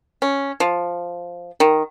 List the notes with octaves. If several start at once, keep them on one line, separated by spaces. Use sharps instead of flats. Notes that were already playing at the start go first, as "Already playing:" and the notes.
C#4
F3
D#3